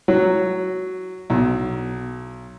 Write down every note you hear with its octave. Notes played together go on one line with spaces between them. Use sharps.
F#3
B1